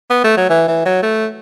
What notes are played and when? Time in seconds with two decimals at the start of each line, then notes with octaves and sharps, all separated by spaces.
0.10 B3
0.24 A3
0.37 F#3
0.49 E3
0.68 E3
0.85 F#3
1.02 A3